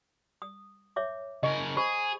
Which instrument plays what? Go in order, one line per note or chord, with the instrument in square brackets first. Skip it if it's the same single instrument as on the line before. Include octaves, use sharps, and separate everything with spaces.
[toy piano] D#6
C#5 E5 D6
[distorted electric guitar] C#3 A#4 [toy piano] D#5 C#6
[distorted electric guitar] G#4 [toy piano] C5 B5 C#6